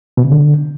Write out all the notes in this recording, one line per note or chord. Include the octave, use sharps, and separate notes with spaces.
B2
C#3
D3